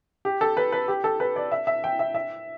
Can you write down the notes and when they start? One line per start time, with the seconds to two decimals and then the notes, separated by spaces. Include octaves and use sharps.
0.25 G4
0.41 A4
0.57 B4
0.72 B4
0.88 G4
1.04 A4
1.20 B4
1.36 D5
1.52 E5
1.67 E5
1.84 G5
1.99 E5
2.15 E5